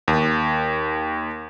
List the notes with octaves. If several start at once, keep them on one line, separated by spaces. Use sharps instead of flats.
D#2